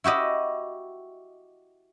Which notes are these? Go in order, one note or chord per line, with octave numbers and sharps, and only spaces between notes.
E4 F#4 G4 D#5